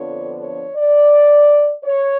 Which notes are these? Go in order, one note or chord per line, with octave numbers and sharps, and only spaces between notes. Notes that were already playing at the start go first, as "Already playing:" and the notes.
Already playing: F2 D3 F3 B3 D4 C#5
C#5
D5
C#5